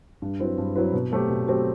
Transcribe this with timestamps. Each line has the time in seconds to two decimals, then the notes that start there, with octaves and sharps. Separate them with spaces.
0.22 G2
0.40 F#3 C4 E4 B4
0.58 G2
0.76 F#3 C4 E4 B4
0.93 B2
1.12 F#3 A3 C4 G4
1.30 B2
1.48 F#3 A3 C4 G4